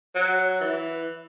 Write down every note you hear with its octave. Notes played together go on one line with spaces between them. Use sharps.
F#3
E3